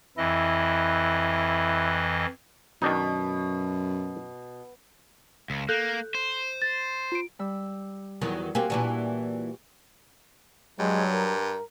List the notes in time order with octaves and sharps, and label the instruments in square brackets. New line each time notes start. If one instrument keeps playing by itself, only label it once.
[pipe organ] F2 E3 D#5 [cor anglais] E4
[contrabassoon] F#2 [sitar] B2 [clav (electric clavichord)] D#3 D4 D#4
[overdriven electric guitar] C#2
[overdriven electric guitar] A#3 [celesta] A4 F#6 G6
[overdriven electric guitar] C5
[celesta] A6
F4 D7
[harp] G3 E6
[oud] E2 D#3 F#3
[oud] A#3 C4 [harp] F#4 G4 G#5
[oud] A#2 E3 D4 [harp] C#6
[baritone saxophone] G2 [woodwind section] F#3 [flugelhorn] G#3
[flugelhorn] A#4